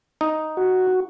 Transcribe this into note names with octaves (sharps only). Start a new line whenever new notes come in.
D#4
F#4